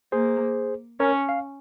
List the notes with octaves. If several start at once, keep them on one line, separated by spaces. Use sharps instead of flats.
A#3 G#4 C5
C#4 A#4 C#5
F5